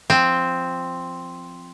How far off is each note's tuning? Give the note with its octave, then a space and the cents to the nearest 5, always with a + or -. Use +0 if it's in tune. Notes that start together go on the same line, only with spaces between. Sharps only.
F3 +0 C4 +0